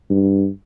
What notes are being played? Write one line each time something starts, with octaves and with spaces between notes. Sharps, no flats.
G2